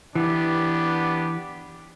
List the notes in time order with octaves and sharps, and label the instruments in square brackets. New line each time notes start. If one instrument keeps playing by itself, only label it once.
[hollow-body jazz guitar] E3 [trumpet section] B3 D4 G4